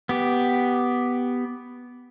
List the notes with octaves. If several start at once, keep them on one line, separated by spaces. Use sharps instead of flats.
B3 G4